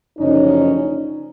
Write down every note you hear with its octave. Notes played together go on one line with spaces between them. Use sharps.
F#1 F#2 D3 F3 C#4 D#4